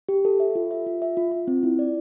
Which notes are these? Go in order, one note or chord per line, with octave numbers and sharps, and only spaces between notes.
G4
A4
E5
F4
E5
F4
E5
F4
F4
C4
E4
D5